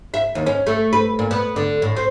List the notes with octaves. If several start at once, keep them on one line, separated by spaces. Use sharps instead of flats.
E5
D#2
C#4
A3
B4
A#2
B3
D3
A2
C4